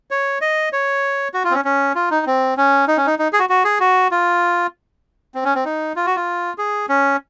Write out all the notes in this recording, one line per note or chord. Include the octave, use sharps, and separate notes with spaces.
C#5
D#5
C#5
F#4
F4
C4
C#4
C#4
F4
D#4
C4
C#4
D#4
C#4
D#4
D#4
G#4
F#4
F#4
G#4
F#4
F4
C4
C#4
C4
D#4
F4
F#4
F4
G#4
C#4